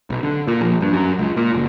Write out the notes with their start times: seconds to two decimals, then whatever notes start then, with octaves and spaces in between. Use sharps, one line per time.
0.10 B1
0.23 D3
0.47 A#2
0.61 A#1
0.81 G2
0.93 F#2
1.19 C#2
1.36 A#2
1.54 F#1